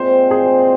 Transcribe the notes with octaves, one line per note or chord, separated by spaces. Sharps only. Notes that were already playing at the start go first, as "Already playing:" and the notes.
Already playing: A#2 G#3 C4 C5
G#4